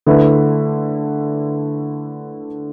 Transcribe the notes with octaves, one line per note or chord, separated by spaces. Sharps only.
D3 A3 E4 B4